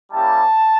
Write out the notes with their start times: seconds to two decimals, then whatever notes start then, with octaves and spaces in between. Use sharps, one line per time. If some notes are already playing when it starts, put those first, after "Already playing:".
0.11 G3 A#3 C#4 E4 G4 A5